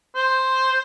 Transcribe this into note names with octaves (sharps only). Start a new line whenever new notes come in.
C5